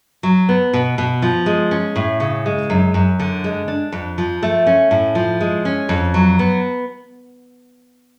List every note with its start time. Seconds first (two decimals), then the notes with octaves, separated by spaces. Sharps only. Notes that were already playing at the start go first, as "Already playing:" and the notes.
0.23 F#3
0.49 B3
0.73 B2
0.98 B2
1.22 F3
1.46 G#3
1.71 C#4
1.96 A2
2.20 C#3
2.46 G#3
2.70 F#2
2.94 F#2
3.19 D3
3.44 G#3
3.68 D4
3.92 F2
4.18 F3
4.43 A3
4.67 C#4
4.91 A2
5.15 F3
5.40 G#3
5.65 C#4
5.89 F2
6.14 F#3
6.39 B3